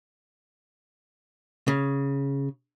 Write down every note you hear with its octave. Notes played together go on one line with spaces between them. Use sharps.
C#3